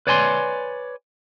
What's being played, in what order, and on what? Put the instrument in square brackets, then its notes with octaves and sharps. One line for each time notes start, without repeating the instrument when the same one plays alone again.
[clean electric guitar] B4 C#5 D5 G#5 C6